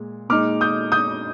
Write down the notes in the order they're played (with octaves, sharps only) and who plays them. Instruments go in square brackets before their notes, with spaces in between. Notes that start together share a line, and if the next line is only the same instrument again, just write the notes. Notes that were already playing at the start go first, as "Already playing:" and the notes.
Already playing: [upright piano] A#2 G#3
A#2 G#3 D#4 D6 F6
D#6 G6
D#6 G6